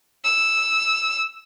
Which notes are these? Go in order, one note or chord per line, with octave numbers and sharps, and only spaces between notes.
E6